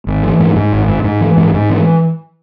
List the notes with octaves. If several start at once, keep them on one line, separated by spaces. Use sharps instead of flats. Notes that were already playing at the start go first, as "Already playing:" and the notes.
G#1
E3
G#2
G#2
G#1
G#2
G#2
E3
G#2
G#2
E3